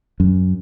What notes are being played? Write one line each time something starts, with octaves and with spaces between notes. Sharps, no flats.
F#2